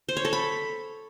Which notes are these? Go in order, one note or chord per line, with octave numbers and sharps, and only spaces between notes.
C5
C#5
A4
B5